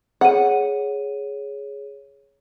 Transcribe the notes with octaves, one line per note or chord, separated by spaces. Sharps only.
G#4 C#5 F#5 D#7